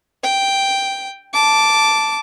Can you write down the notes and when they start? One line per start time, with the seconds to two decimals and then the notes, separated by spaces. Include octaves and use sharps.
0.24 G5
1.34 A5 D6